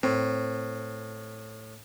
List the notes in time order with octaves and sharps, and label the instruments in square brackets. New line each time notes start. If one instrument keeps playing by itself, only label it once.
[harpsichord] A2 [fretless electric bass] C4